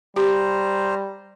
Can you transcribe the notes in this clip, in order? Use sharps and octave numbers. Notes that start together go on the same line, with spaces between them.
G3 G4 C5 A#5